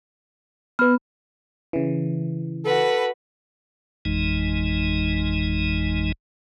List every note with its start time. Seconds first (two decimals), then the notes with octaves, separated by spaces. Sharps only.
0.79 B3 B4 F6
1.73 C#3 E3
2.65 F#4 A4 B4
4.05 G#1 F2 E3 G#3 D#4